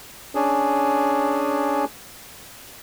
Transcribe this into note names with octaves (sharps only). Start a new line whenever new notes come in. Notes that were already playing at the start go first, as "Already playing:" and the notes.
C#4 D4 G#4